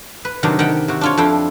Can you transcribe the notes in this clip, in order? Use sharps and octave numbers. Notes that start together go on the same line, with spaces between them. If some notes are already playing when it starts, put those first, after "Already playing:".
B4
C3 D#3 F#3 D4
D#3 G4 F#5 G5
C3 F#4
D4 F4 C#5
F2 F3 D4 E4 G5